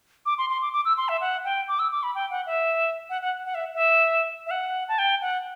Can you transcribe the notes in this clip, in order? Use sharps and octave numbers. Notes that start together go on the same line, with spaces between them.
D6
C6
C6
D6
D6
E6
C6
E5
F#5
G5
D6
E6
D6
B5
G5
F#5
E5
F#5
F#5
F#5
E5
E5
E5
F#5
A5
G5
F#5